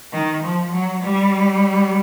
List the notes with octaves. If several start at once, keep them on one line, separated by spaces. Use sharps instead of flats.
D#3
F3
F#3
G3